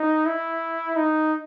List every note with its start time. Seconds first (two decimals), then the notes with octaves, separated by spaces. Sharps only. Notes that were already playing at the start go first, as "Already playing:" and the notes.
Already playing: D#4
0.26 E4
0.96 D#4